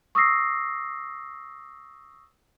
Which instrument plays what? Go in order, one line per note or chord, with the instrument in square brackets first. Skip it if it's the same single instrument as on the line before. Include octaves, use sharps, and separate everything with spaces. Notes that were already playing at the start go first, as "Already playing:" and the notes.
[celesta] C#6 D#6 E6 A#6 C7